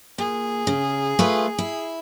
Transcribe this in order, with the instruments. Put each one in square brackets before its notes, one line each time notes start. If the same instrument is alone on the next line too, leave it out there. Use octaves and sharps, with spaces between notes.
[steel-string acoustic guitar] A#2 [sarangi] G#4
[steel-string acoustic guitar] C#3
A3 F4 B4
E4